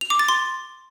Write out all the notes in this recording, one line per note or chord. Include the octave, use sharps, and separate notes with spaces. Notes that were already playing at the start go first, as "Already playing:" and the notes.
F7
D6
A6
C6